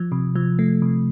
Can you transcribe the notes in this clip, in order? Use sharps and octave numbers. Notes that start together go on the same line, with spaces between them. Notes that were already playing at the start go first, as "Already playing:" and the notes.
Already playing: F3
C3
F3
A3
C3